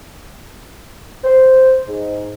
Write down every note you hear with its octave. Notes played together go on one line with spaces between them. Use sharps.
C5
G#2